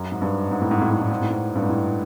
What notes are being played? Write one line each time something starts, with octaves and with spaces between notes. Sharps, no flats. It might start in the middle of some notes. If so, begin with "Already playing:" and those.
Already playing: F#2
G#2
G2
G#2
A2
G#2
A2
G#2
A2
G#2
A2
G#2
G2
G#2
A2